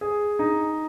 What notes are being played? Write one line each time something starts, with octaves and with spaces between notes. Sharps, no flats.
G#4
D#4